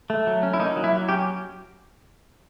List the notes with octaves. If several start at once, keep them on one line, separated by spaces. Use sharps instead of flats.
A3
F#3
C#4
E4
A#3 D#4
F#3
E4
F#3
C#4 G4